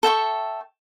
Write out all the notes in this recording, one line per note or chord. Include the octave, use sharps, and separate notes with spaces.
A4 E5 G5 C#6